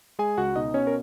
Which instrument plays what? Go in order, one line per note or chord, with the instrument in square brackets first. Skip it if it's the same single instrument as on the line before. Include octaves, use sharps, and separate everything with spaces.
[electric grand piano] G#3 G#4 G#5
C#2 F#4 F#5
B2 D#4 D#5
B2 C#4 C#5
A#4